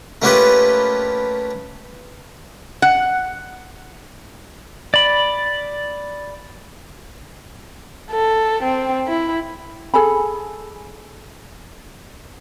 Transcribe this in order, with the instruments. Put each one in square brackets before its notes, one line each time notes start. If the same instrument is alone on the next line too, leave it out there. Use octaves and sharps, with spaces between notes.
[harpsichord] A3 A#3 C#4 F4 G4 B4
[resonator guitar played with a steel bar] F#5
[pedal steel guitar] D5 B5
[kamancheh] A4
C4
E4
[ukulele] G#4 A4 G#5 B5